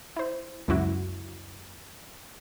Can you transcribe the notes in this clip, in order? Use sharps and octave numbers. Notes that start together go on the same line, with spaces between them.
E4 C5
C#2 F#2 E4 F#4